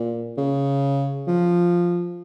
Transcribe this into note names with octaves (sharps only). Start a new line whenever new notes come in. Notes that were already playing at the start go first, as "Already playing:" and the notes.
Already playing: A#2
C#3
F3